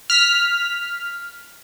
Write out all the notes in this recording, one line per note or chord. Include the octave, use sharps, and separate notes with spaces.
F6 B6